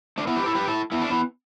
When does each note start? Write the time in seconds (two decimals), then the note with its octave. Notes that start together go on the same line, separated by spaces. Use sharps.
0.18 A3 D4
0.27 B3 E4
0.36 G4 B4
0.46 E4 A4
0.55 G4 B4
0.67 E4 A4
0.92 B3 E4
1.01 A3 D4
1.10 B3 E4